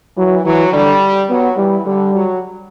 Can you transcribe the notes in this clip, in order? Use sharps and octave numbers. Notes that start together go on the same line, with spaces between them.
E3 F#3
E3 F#3
D3 G3
F#3 B3
E3 G3
D3 G3
F#3